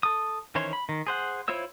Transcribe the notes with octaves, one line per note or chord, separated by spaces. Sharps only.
A4 D#6
D#3 E3 C#4 C5 C#5
B5
D#3
G#4 C5 F#5
E4 F4 C5 C#5 E6